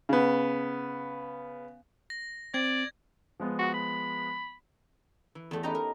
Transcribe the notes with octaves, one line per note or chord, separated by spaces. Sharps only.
C#3 B3
A#6
C4 D5 G#6
F3 G#3 B3
F#4
B5
E3
E2 A3 G4
C#4 D#4 G4 B4 G5 A#5
A#4